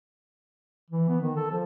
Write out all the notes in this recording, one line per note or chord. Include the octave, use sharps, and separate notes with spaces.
E3
B3
D#3
A4
F3